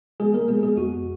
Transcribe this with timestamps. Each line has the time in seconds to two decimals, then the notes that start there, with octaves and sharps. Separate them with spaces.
0.20 G#3 B3 G#4
0.34 A#3 A#4
0.48 G#3 B3 G#4
0.63 G#3 G#4
0.77 F2 F#4